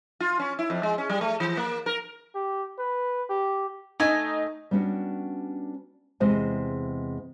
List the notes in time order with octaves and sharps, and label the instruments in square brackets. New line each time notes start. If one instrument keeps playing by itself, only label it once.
[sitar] F4
C#4
E4
F2
G#3
C#4
G3
A3
E3
A#3
A#4
[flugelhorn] G4
B4
G4
[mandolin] A3 G#5 [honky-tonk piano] D#4
[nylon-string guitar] G3 B3 C#4 D4 F#4
E2 C3 G#3 C5 D#5 G#5